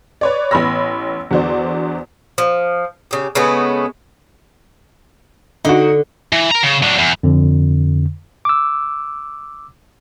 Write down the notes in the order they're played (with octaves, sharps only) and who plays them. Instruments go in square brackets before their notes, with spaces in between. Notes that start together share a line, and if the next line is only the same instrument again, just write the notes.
[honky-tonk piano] B4 C#5 D5
A1 B3 C#5 B5 E6 A#6
E2 D3 F#4 C5 D5
[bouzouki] F3
C#3 G4
C#3 G#3 A3 B3
[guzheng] D3 [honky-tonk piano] D#4 F#4
[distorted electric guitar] E3
A#4 A#5
C#3
F#3 D4
E2
[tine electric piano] F2 D3
D6 E6